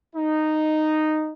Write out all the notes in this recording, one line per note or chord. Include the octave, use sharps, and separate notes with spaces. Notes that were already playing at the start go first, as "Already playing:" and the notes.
D#4